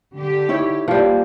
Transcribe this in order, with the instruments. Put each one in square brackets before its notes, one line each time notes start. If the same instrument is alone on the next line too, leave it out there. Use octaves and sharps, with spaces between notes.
[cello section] D3 G4
[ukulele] D#4 E4 C#5
[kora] F3 G3 [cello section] A#3